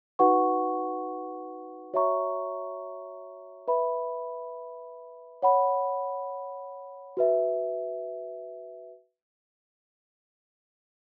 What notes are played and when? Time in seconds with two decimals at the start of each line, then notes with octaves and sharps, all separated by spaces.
0.19 D#4 F#4 B4 F#5 C#6
1.94 F#4 C#5 E5 A#5 C#6
3.68 B4 E5 B5
5.42 C#5 F#5 B5
7.17 F#4 B4 E5